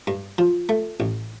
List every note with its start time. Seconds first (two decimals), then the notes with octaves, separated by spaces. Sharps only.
0.07 G2
0.38 F3
0.69 A3
1.00 A1